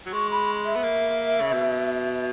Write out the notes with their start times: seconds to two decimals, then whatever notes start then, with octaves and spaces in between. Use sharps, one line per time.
0.06 F#3
0.13 G#3 C#6
0.31 B5
0.65 E5
0.75 B3
0.83 A#3
1.41 C#3
1.53 B2